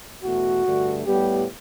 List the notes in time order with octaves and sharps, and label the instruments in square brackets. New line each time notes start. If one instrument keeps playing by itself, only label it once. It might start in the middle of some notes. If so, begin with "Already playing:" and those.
[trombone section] E2 B2 A3 F#4
G2 D3 A3
A2 G3 B3 G4